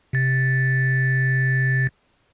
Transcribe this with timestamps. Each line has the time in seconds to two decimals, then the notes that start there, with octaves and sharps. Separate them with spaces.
0.13 C3 A6